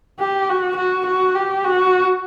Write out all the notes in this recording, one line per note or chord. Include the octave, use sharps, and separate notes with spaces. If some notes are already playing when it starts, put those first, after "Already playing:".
G4
F#4
F#4
F#4
G4
F#4